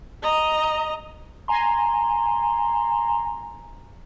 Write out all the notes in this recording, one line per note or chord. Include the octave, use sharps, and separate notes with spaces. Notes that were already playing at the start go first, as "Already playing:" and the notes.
D#5 A#5
G#5 A#5 C6